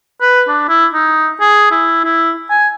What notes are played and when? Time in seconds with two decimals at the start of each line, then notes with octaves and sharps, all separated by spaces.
0.22 B4
0.48 D4
0.69 E4
0.94 D#4
1.40 G#4
1.71 E4
2.04 E4
2.50 G#5